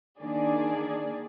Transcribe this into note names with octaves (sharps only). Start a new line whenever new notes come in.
D#3 A#3 D4 G#4 D5